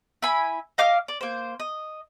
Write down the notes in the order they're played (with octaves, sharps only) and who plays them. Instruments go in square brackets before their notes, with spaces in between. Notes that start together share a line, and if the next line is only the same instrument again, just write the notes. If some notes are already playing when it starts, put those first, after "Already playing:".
[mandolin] E4 G#5 B5
D#5 F5 D6 F6
D5
A#3 C5
D#5